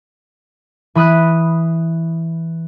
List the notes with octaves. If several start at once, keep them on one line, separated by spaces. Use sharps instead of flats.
E3 B5 D#6 F#6